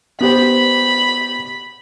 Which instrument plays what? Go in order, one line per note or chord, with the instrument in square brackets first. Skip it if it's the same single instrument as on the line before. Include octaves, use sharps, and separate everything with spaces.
[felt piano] B3 G4 C5 [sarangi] B5